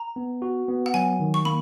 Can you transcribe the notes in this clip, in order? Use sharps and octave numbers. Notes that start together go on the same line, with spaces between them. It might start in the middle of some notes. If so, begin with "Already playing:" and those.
Already playing: A#5
B3
F#4
B3
F#5
F#3 G#5
D#3
C#6
A#3 B5